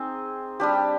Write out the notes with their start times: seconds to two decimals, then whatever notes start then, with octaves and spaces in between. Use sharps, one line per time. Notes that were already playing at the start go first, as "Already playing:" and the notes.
Already playing: C4 D#4 G#4
0.60 G3 D4 G4